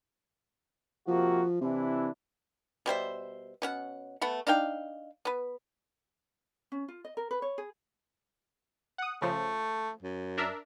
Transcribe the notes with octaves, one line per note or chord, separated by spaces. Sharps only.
C3 F3 A#3 F#4
C3 E3 D4 E4
B2 G3 C5 E5
B2 C#4 F#5
A3 B3 F#5
D4 D#4 F5 G5
B3 B4
C#4
F4
D#5
A#4
B4
C#5
G#4
F#5 D#6
C#3 F3 A3
F#2
D4 A#4 E5